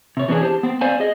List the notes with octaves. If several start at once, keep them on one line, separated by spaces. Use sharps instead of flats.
C3 C#5
E3 B3 C#4 D4 G#4
G4 C5 A5
B3 C4
C4 C5 D5 F5 G#5
G#4 D#5